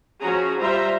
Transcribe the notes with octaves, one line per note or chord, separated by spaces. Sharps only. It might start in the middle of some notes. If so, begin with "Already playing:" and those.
F3 C#4 F#4 G#4 A#5
G3 F4 C5 E5 A#5